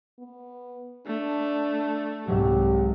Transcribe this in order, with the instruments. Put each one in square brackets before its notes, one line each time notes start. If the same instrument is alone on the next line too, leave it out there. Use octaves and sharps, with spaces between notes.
[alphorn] B3
[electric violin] A3 [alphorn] D4
[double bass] C2 [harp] G#2 F#3 [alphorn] G4